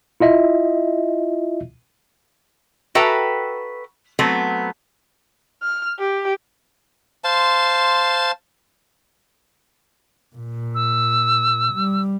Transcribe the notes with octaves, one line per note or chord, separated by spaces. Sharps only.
E4 F4 D#5 E5
F#4 A4 B4 E5 G5 A#5
F#3 A3 B3 C4
F6
G4
C5 F5 A5 C6
A#2
E6
G3